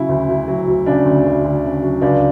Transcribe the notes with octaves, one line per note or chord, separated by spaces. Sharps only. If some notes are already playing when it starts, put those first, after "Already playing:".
Already playing: C#3 F#3 E4
D2
D2
F#3
D2
C#3 D4
D2
D2
D2
C#3
F#3
C#2 D4